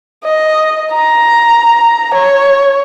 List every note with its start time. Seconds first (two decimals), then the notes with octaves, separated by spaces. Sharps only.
0.24 D#5
0.92 A#5
2.14 C#5